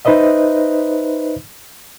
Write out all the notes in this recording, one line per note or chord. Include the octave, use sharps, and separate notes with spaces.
D#4 B4 C5 D#5 E5